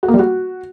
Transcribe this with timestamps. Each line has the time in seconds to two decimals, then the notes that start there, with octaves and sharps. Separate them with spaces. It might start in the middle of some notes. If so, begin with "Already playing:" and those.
0.03 F#4
0.08 A#3
0.14 G3
0.19 F#4